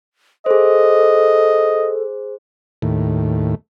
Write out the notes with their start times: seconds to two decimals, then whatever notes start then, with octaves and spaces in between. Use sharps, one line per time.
0.46 G#4 A4 C5 D#5
2.82 D#2 A2